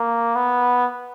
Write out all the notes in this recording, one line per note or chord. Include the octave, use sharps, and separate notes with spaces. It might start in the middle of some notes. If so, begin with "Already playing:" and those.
Already playing: A#3
B3